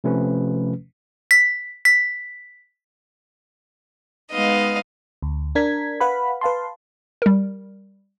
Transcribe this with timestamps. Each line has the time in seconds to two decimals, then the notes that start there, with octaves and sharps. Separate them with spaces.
0.04 C3 F3 A3 C#4 B4
1.31 B6
1.85 B6
4.32 G#3 B3 D#4 D#5 F5
5.22 D2
5.55 D4 A#4 G#6 B6
6.00 B4 F5 F#5 B5
6.41 B4 F5 A5 C6
7.22 G3 A#4